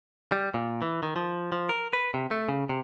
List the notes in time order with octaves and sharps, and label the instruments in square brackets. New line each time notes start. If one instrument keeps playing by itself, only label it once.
[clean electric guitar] G3
A#2
E3
D#3
F3
F3
A#4
B4
C3
A3
C#3
C3